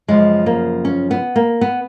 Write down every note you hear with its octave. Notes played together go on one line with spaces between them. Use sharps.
F#2 C#3 F3 G#3
A#3
C#4
B3
A#3
B3